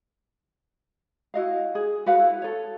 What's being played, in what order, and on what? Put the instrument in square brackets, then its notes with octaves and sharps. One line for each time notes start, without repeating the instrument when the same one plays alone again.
[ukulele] E4 F#4 D#5 F5
G#4
F#4 B4 F5 F#5
E4
A4 C#5